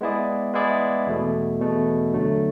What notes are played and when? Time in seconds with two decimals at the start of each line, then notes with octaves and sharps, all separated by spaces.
0.01 G#3 B3 E4 G#4 D5
0.54 G#3 B3 E4 G#4 D5
1.07 E2 B2 A3
1.60 E2 B2 A3
2.13 D2 D3 F#3 A3 D4